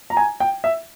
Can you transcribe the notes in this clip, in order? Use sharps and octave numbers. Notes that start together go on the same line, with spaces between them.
A#5
G#5
G5
E5